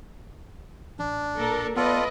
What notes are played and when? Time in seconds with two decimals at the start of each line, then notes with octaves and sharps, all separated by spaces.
0.99 A1 D4
1.37 A#2 A4 A#4
1.76 B3 F4 A4 B4 D5 D#5